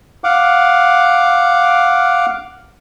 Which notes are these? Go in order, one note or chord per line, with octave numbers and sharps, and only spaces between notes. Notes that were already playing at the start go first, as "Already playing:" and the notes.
F5 F#5 D6